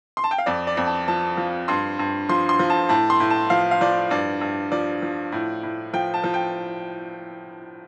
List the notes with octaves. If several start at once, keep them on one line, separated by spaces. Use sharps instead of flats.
C6
A5
G5
F5
F2 D5
D5
F2
A5
F3 A5
F3
G2 C6
G2
F3 C6
C6
F3
A5
A2 A5
C6
A2
A5
F3 F5
F5
F3 D5
G2 D5
G2
F3 D5
F3
A2
A2
F3 G5
A5
F3
G5